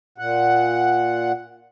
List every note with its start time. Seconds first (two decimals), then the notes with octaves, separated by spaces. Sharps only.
0.18 A#2 F#5